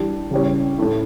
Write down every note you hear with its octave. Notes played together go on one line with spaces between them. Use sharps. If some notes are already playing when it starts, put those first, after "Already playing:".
Already playing: E3 G3 D4 G4
C#3 E3 G3 C#4
A2 E3 A3 E4